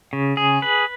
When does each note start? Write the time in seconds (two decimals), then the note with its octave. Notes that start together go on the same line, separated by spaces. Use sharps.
0.13 C#3
0.37 G#4
0.62 B4